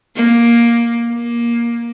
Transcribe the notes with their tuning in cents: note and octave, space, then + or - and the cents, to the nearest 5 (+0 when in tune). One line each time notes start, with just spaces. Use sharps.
A#3 +10
A#3 +15